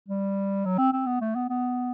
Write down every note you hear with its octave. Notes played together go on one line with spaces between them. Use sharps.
G3
F#3
C4
C4
B3
A3
B3
B3